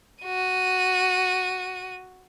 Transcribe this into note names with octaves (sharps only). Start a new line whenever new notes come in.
F#4 D#7